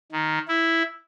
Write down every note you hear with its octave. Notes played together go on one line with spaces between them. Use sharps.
D#3
E4